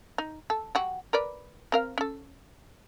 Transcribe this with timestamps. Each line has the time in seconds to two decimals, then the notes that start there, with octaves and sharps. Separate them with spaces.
0.18 D#4
0.50 A4
0.75 F#3 F#4 G4
1.13 A#4 B4 D5
1.72 C4 A#4 F5
1.98 C#4 A4